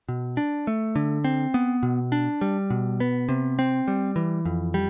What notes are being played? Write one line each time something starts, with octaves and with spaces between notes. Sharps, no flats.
B2
D4
A3
D3
C4
B3
B2
D4
G3
B2
B3
C3
C4
G3
E3
F2
G3